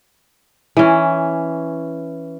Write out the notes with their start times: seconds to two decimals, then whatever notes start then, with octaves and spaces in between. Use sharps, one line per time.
0.77 E3 C#4